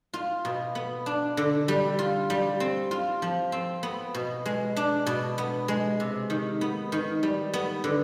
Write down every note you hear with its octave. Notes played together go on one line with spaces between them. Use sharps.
F4
B2
B3
D4
D3
G3
F4
G3
C4
F4
F3
C4
B3
B2
G#3
D4
B2
B3
G#3
C3
D#3
B3
D#3
G3
B3
D3